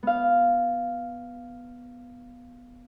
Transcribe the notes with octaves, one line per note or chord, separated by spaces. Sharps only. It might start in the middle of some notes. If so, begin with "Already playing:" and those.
B3 F5